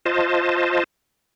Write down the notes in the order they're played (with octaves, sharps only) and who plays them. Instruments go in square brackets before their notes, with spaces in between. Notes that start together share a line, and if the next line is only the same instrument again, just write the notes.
[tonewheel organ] F4 C5 D#5 A5